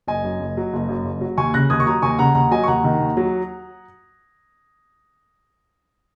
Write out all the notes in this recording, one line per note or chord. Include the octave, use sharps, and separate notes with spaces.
F#1 D#5 G#5
F#2
F#1
F#3
F#1
F#2
F#1
F#3
D#2 G#5 C#6
C#3 F#6 A#6
D#2 D#6 G#6
C#6
F#3 A#5 D#6
D#2 G#5 C#6
C#3 F#5 A#5
D#2 F#5 A#5
F#3 D#5 G#5
C#6
D#2 F#5 A#5
D#3
D#2
F#3